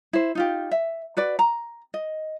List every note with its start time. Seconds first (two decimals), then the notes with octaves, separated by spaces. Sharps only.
0.13 E4 C5
0.35 D#4 F4 G4
0.71 E5
1.17 F#4 B4 D5
1.39 A#5
1.94 D#5